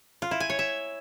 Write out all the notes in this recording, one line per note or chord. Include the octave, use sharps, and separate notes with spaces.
F4
E4
G#5
C#5
E5